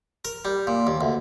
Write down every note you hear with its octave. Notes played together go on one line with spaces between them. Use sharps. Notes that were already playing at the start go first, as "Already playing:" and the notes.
A#4
G3
A#2
D#2
D2